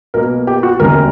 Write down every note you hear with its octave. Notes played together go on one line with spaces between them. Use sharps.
B1 B2 A#3 A#4
G4
F#4
E1 D2 C#3 G3 A#3 A#4